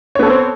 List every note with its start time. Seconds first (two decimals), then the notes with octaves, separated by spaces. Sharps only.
0.15 C#5
0.19 B3
0.23 A4
0.26 C4
0.30 C5